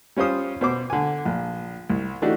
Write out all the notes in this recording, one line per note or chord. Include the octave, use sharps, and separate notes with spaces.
G3 C#4 F4 C5 D#6
B2 C5 D6
D3 G#5
A#1
C2
E3 A3 D4 D#4 F#4 G4